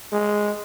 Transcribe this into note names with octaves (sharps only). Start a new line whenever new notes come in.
G#3